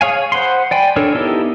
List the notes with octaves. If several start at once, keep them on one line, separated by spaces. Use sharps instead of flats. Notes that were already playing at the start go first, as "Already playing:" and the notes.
G#4 C#5 F5 G#5
C5 F#5 B5 C6
D5 G5 G#5 B5
D4 A4 A#4 C#5
B3 D#4 E4 G4 A4